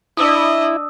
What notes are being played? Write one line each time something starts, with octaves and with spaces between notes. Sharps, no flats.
D4 E4 D#5 D#6 E6